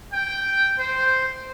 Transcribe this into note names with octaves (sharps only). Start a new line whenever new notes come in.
G5
C5